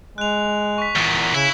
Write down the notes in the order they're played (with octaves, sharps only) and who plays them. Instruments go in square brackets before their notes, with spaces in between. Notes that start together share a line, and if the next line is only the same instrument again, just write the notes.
[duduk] G#3 [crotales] F#6 F7
[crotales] C#6 B6
[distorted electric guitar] E2 A#2
[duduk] C#3 [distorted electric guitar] E4